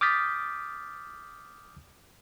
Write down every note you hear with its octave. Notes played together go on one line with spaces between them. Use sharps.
D6 D#6 F6 G6 A6 B6